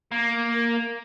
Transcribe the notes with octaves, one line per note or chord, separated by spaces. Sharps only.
A#3